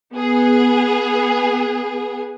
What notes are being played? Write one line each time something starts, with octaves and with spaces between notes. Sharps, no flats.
B3 G#4